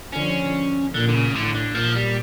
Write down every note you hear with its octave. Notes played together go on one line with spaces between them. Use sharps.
D3 F3 C#4
A#2 D3
D3
C#3
A2 D3
D3
A#2 F3
G3